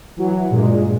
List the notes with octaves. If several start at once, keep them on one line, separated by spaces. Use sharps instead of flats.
E3 F#3
G2 A#2 G#3